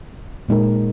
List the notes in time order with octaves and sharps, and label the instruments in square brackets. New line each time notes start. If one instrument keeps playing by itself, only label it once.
[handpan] A#2 G#3 D#4 A#4